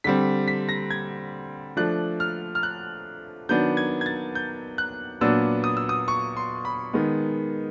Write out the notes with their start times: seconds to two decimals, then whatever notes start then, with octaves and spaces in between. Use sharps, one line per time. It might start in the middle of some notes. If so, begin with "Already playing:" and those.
0.04 D3 G3 C4 B6
0.48 B6
0.69 A#6
0.91 G#6
1.77 F3 A3 D4 F#6
2.20 F6
2.55 F6
2.63 F#6
3.49 D#3 F#3 B3 D4 G6
3.77 G#6
4.01 G#6
4.06 A6
4.35 G6
4.78 F#6
5.21 A#2 F#3 B3 D4 E6
5.64 D#6
5.77 E6
5.89 D#6
6.08 C#6
6.37 C6
6.65 B5
6.93 D#3 G#3 B3